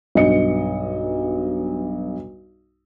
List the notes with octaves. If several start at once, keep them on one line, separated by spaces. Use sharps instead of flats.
B1 G2 D#5 C#7